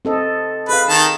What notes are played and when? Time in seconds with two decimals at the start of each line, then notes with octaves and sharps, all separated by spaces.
0.05 C4 A4 D#5
0.69 G#4 B4 F5
0.89 D#3 A5